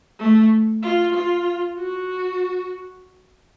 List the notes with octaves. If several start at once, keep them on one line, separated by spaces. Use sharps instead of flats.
A3
F4
F4
F#4